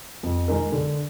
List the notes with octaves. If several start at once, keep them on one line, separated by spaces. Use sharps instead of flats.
F2
D#3 G#3 D#4 A#4
D3